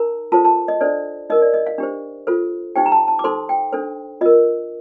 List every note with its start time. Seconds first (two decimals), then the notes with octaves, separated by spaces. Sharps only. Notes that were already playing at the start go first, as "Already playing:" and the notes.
Already playing: D#4 A#4 A#5
0.32 F4 A4 C5 A5
0.45 A5
0.68 D#5
0.81 D4 A4 C5 D5
1.30 D#4 A#4 D#5
1.42 D5
1.54 D#5
1.67 F5
1.78 D4 G4 C5
2.27 F4 A4 C5
2.76 D#4 G4 C5 G5
2.86 A#5
2.92 A5
3.08 A5
3.19 D6
3.24 D#4 A4 C5 C6
3.49 G5
3.73 D4 A4 C5
4.21 F4 A#4 D#5